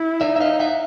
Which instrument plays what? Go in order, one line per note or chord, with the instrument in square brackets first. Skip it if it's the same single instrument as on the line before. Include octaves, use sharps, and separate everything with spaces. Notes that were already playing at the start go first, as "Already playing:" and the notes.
Already playing: [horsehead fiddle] E4
[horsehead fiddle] D#4 [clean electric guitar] D5 E5
[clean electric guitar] E5
D#5 F5
E5 F#5